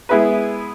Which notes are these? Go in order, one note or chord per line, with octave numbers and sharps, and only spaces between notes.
G#3 B3 E4 G#4 B4